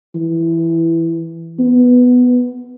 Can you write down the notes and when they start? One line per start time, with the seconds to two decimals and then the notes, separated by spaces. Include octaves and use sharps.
0.15 E3
1.59 B3